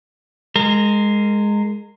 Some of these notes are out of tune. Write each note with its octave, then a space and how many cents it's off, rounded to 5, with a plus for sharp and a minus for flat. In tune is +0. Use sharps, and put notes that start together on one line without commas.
G#3 +0 A#4 -25